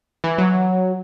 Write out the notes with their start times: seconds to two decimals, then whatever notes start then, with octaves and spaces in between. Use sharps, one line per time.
0.24 E3
0.38 F#3